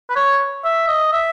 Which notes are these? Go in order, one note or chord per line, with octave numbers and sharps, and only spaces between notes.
B4
C#5
E5
D#5
E5